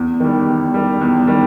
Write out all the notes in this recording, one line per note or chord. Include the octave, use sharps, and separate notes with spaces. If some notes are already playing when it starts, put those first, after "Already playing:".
Already playing: E2
D#3 G3
E2
D#3 G3
E2
D#3 G3